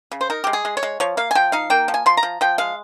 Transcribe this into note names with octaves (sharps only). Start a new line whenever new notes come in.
C#3
C5
D#4 A#4
G#3 G4
G#4
G#3
C#5
G#3
F3 C#5
A#3 F5
G#5
F3 G5
D#4 F5
A#3 G5
F3
G#5
F3 C6
A#5
F3
F3 G5
G#3 F5